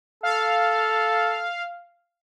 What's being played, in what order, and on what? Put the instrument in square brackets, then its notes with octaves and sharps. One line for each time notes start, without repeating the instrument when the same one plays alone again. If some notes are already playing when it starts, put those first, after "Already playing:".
[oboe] A4 [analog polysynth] F5